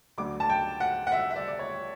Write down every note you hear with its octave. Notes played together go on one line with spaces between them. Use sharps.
D2 D3 F#3 D6
A5
G5
F#5
F#5
E5
E5
D5
D5
C#5